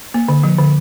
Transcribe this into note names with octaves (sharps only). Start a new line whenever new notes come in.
A#3
D3
F3
D3